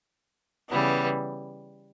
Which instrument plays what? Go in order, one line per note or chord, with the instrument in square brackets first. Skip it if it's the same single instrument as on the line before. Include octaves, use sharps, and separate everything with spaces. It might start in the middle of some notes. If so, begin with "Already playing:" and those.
[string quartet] C#3 E3 G3 B3